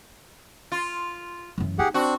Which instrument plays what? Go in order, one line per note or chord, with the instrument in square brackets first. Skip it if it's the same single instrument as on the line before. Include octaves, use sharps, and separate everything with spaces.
[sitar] F4
[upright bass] F#2 E3
[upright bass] D#4 [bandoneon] G4 G#4 F#5
[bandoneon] C4 D4 [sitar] F#4